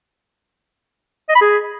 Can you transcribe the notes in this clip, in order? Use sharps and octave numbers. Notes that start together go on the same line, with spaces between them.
D#5
B5
G#4